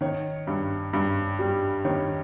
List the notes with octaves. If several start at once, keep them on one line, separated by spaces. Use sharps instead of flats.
D#3 C#5
G2
G2
G3
D#3 C#5